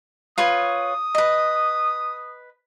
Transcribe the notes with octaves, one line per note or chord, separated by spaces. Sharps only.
F4 B4 C#5 D#6
B4 D#5